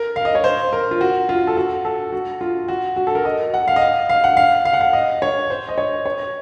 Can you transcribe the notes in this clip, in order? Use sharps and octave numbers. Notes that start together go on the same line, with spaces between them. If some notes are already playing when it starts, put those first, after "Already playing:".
Already playing: A#4
F5
D#5
C#5
C5
A#4
F4
F#4
F4
A4
F#4
A4
F#4
F4
F#4
F#4
A4
A#4
D#5
F#5
F5
D#5
F5
F5
F#5
F5
F5
F#5
F5
D#5
C#5
C5
D#5
C#5
C#5